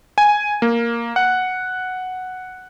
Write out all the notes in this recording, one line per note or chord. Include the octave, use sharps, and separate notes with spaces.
G#5
A#3
F#5